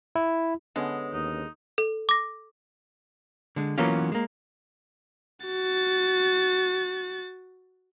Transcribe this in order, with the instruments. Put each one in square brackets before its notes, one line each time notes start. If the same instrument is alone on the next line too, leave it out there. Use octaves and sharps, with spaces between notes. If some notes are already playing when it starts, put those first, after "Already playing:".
[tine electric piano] E4
[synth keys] D3 B3 C#4 [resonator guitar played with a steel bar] G#3
[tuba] D#2 [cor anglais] D#4
[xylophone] A4
D6 A#6
[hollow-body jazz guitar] D3 G#3
E3 F#3 A#3 B3 C#4 F4
G#3 A#3
[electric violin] F#4 A6